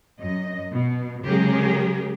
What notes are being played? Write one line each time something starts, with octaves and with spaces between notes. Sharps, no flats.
F#2 D#5
B2
C#3 F#3 G#3 G4 G#4 A#4